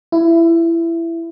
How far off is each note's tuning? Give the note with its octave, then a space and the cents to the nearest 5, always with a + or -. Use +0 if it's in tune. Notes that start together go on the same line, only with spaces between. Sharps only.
E4 +15